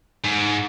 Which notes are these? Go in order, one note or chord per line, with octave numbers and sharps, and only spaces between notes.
G#2